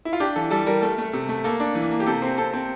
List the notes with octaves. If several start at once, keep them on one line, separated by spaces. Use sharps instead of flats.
E4
F4
D4 G4
E3 A4
G3 A4
G3 A#4
A3 A4
A3
C3
A3
A#3 A4
D4
E3
A#3
G4
C3 A4
C4
C4 A4
C4